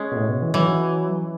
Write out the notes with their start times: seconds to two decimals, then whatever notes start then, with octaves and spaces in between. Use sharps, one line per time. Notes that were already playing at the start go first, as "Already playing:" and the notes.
Already playing: G#3 C#4
0.12 B2
0.16 A2
0.29 B2
0.42 E3
0.54 E3 F#3